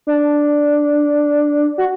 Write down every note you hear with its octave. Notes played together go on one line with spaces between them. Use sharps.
D4
F#4